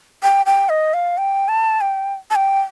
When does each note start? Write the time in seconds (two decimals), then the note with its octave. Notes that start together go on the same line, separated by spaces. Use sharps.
0.23 G5
0.46 G5
0.69 D#5
0.94 F5
1.18 G5
1.48 A5
1.81 G5
2.31 A5
2.35 G5